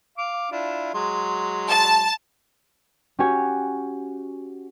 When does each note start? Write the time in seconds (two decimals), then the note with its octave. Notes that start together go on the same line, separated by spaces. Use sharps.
0.18 F5 D6
0.52 D4 E4 F4
0.94 F#3 G#3 C6
1.69 A5
3.19 C#4 F#4 G4 C#5 G#5